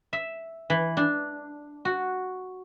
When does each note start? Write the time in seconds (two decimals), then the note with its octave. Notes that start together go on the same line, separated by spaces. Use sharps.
0.13 E5
0.70 E3
0.97 D4
1.85 F#4